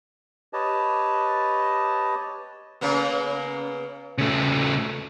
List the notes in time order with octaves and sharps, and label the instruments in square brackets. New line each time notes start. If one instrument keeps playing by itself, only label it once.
[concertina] G4 B4 C#5 D#5 A5
[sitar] C#3 A#3 B3
[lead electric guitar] C#3 A3